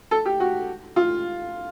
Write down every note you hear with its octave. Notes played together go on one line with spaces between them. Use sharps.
A4
G4
F#4
F4